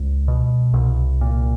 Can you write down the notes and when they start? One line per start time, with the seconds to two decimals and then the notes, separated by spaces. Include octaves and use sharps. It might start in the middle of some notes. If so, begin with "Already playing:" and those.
Already playing: C#2 G#3
0.28 B2
0.74 C2
1.21 A#2